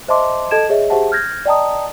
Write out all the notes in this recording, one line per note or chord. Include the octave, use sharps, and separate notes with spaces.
C5 D#5 E5 A5 C6 D6
A4 D#5 A5 G#6 D7 E7
G#4 C#5 D#5 E5
G4 G#4 C5 E5 F#5 A5
F6 G6 G#6 A#6
D5 D#5 G5 A5 A#5 D#6